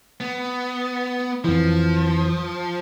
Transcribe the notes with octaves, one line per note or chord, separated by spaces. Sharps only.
B3
F2 E3 F3